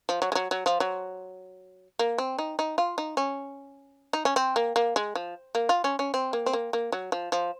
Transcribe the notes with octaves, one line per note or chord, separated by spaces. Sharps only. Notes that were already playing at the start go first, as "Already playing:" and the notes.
F3
F#3
G#3
F#3
F#3
F3
F#3
A#3
C4
D#4
D#4
F4
D#4
C#4
D#4
C#4
C4
A#3
A#3
G#3
F3
A#3
F4
C#4
C#4
C4
A#3
C4
A#3
A#3
F#3
F3
F3